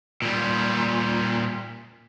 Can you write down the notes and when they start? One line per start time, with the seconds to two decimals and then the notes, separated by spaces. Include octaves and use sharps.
0.22 A#2 G3